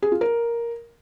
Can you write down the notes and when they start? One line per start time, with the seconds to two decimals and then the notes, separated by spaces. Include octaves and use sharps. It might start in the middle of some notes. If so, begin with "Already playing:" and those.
0.02 G#4
0.12 F4
0.21 A#4